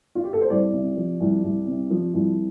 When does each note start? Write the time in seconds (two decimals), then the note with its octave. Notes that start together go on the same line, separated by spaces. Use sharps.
0.15 F4
0.24 G4
0.33 A4
0.41 C5
0.50 C2 D5
0.73 C3
0.97 F3
1.20 C2
1.43 C2
1.67 C3
1.90 F3
2.14 C2